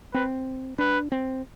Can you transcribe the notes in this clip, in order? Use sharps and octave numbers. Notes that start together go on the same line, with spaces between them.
C4 B4
D4 B4
C4